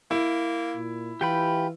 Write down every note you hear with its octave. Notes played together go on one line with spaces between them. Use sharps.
A#3 E4
A#2
E3 F4 G4 G5 B5